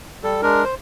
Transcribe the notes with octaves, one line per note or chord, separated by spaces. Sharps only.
G3 A4
G#3 D4 A#4
C5